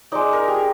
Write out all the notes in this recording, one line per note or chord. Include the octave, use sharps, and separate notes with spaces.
G#3 D#4 D5
A#4
G4
G#4